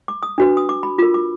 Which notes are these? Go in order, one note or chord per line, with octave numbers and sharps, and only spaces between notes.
D6
D#6
D4 F#4 B4
D#6
D6
B5
F4 A#4 D6
D6